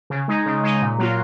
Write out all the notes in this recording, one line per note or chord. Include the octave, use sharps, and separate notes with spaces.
C#3
G#3 D#4
C#3
G#3 D#4
A#2
F#3 A#3 F4